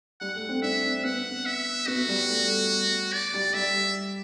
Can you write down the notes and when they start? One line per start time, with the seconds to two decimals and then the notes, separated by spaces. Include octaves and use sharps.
0.21 G3 F#5
0.35 A3
0.49 C4
0.62 D4 E5
0.83 C4
1.04 B3 F#5
1.46 E5
1.87 B3 F#4
2.09 G3
2.29 A3
3.13 D5
3.34 G3
3.54 G3 E5